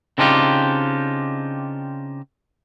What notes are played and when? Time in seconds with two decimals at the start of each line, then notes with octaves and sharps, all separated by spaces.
0.18 C#3 C4 D4 D#4 F4 G4